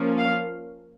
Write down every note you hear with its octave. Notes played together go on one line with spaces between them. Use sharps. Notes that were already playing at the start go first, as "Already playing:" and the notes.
Already playing: F3 A#3 C#4
F5